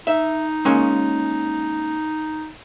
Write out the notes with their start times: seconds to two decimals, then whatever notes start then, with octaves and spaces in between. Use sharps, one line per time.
0.07 D#4 E5
0.65 G#3 A#3 C#4